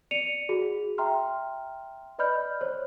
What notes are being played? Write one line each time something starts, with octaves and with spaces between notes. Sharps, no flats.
D5 C#7 D#7 F7
F#4 G#4
E5 G5 A#5 C6 F6
B4 D5 D#5 B5 F6 G6
C5 C#5